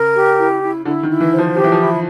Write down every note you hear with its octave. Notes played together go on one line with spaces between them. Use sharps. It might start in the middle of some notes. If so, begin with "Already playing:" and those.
Already playing: C#3 A#4
G4
E4
E4
D3 E4
D#3
E4
E3
C5
F3
F3 G4
E3
F3
E4